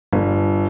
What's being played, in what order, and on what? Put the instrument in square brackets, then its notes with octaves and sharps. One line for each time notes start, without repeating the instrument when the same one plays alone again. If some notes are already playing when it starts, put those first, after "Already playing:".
[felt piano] G1